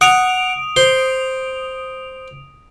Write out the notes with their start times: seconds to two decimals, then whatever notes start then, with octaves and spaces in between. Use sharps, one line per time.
0.01 F#5 D#6 D7 F7
0.76 C5 C6